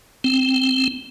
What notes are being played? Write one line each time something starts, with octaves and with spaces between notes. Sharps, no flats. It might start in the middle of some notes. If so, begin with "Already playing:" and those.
C4